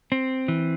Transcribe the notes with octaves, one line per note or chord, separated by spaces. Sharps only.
C4
E3